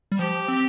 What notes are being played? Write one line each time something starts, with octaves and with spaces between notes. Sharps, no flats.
G3
F3 G4
C4